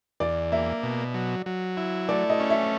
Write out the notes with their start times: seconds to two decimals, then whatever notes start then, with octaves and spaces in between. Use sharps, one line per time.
0.20 E2 D5
0.52 A#3 E5
0.83 B2
1.14 F#3
1.46 F#3
1.77 E4
2.09 A3 D5
2.30 D#5
2.40 C#4
2.50 E5